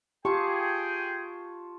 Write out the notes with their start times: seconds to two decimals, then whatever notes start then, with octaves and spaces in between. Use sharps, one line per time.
0.25 F4 G4 G#4 G5 A5 C#6